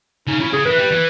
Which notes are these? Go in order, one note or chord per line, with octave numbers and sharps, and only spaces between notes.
C#3 D#4
C#3 E4
C#3 G#4
E3 B4
G3
E3